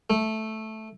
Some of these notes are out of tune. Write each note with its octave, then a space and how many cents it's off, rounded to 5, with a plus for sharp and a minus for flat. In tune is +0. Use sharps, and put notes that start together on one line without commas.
A3 -5